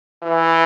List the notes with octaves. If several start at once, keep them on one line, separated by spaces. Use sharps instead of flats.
E3